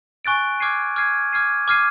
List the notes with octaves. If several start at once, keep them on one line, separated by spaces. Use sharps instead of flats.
G#5 C#6 F#6 A6 D7
D6 F6 G#6 C7 D#7
D6 F6 G#6 C7 D#7
D6 F6 G#6 C7 D#7
D6 F6 G#6 C7 D#7